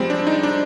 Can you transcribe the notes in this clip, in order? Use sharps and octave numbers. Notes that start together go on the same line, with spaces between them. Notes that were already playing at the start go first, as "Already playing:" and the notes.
Already playing: F3 G3 G#3 C4
D4
D#4
D4